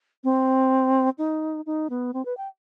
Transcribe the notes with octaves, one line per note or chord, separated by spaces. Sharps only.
C4
D#4
D#4
B3
C4
B4
G5